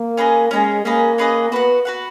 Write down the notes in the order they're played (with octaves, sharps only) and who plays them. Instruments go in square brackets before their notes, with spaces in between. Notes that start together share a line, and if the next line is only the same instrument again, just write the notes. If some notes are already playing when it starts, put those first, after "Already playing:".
Already playing: [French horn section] A#3
[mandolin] C#4 G#4 B4 D#5
[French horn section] G#3 [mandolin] C#4 G#4 B4 D#5
[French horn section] A#3 [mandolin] C#4 G#4 B4 D#5
[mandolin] C#4 G#4 B4 D#5
[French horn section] B3 [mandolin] F#4 B4 F#5
[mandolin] F#4 B4 F#5